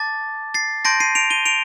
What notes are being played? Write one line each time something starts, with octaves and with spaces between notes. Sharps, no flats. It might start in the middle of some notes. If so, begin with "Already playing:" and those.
Already playing: A5 D6 A6
A6 C7
A5 C6 G6 A#6 D7
C7 D#7
D7 F7
D#7 G7
D7 F7